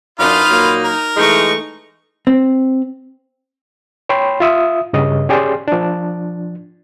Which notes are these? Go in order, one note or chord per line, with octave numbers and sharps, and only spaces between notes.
F#2 D4 D#4 F4 B4 D#5 F5
A#2 F#3 A#3
A#4
E3 G#3 A3 D#4 C#6
C4
C#5 G5 B5 C6
F4 E5 D#6
G2 C#3 D#5
C#4 G4 G#4 D5 G5 C6
F3 D4